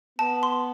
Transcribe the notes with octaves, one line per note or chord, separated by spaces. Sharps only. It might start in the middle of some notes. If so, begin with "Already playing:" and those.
B3 A5
C6